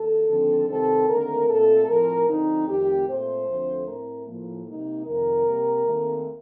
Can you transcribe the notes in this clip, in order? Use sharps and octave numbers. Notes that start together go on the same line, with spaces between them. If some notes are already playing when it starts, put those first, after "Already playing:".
Already playing: D#2 A4
D#2 D3 F3 C4
C3 D#3 G3 C4 A4
D#2 D3 A3 C4 A#4
A#2 A3 C4 A4
A2 F3 C4 A#4
D2 D3 F3 C4 D#4
F2 D#3 A3 C4 G4
A#2 A3 C4 C5
D2 D3 F3 A3 C4
A2 A3 C4 A#4
A2 F3 A#3
C3 G3 A#3 D#4
F2 C3 D#3 A#4
C3 G3 A#3
D#2 D#3 A3 C4